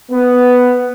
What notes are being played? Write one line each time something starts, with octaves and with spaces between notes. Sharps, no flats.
B3